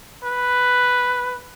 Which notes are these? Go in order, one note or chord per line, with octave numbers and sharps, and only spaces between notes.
B4